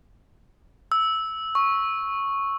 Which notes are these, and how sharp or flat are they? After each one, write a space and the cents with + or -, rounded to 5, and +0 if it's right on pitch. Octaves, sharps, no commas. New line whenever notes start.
E6 -10
C#6 -5